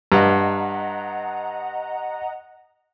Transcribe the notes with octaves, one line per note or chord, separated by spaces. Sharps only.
G2 D#5 F#5 A#5